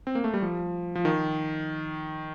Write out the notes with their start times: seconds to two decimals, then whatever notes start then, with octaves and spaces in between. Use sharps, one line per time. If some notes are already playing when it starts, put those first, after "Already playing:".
0.07 C4
0.15 A#3
0.24 A3
0.34 G3
0.42 F3
0.95 F3
1.05 D#3